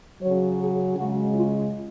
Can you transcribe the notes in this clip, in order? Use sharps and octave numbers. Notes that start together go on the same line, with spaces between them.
C#3 F#3 C#5
G#4
C#3 G#3 F#4
F4